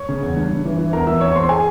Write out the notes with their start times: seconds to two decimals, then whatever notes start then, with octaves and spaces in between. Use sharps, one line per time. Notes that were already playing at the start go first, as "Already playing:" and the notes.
Already playing: C#5 C#6
0.09 C#3
0.23 E2
0.36 G2
0.51 G2
0.65 E3
0.79 E3
0.93 E2 A#4 A#5
1.07 E3 E5 E6
1.21 E2 C#5 C#6
1.31 C#6
1.35 E2 C5 C6
1.49 G#4 G#5